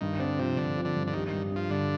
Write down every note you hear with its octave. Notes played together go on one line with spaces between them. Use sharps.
G2 D#3
D3 C4
C3 F3
G2 D3
F3
D3
G2
D3
D#3 G3
D#3
G2
G2 F3
G2 D3